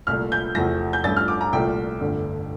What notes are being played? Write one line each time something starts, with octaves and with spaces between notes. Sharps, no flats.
C2 A#2 A3 F6
G6
E2 C3 F3 A3 A#6
G6
A1 G2 F3 A3 A6
F6
D6
A#5
C2 A#2 F3 A3 G5
G1 F2 D3 A3